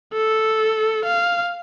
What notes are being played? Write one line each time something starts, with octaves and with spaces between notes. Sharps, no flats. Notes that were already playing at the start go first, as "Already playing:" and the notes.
A4
F5